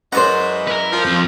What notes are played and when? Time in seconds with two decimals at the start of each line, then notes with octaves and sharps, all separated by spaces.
0.12 F#2 E3 G#3 E4 C5 D5 F#5 A#5
0.67 A#4 B4
0.91 F3
1.05 F2